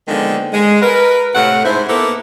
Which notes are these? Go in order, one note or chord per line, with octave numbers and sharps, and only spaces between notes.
D3 D#3 F3 G#3 A#3 B3
G#3
A#4 B4
A2 C3 A3 F5 F#5
G#2 A3 C4 E4 C5
A#3 B3 E4 A4